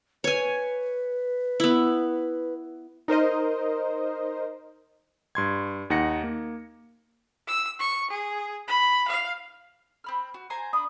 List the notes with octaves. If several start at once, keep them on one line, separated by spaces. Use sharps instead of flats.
B4 C#5 G#5
B3 E4
D#4 A#4 C5 D#5
G2 C6 G#6
D#2 D#4 F#5 A#6 C#7
A#3
E6
C#6
G#4
B5
F5
C4 B5 F6
F#4
C5 G#5 A#5 C6
D4 B5 D#6